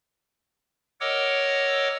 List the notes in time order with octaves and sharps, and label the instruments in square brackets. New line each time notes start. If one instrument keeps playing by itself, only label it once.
[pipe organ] A#4 C#5 D#5 F#5 D6 E6